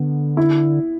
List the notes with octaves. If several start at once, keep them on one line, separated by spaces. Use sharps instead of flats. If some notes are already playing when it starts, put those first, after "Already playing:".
Already playing: D3 B3
E4